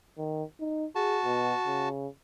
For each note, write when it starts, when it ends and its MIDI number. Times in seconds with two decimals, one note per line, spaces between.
0.18 0.43 51
0.60 0.86 63
0.95 1.89 66
0.95 1.19 68
0.95 1.89 81
1.25 1.53 47
1.66 2.07 49